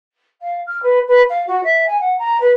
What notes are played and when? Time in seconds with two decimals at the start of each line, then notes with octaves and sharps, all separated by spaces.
0.41 F5
0.66 F6
0.82 B4
1.07 B4
1.29 F5
1.47 F#4
1.63 E5
1.86 G#5
2.00 F#5
2.18 A#5
2.40 B4